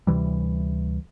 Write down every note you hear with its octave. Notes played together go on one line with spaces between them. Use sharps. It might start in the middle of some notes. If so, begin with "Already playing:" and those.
D2 C3 E3 G3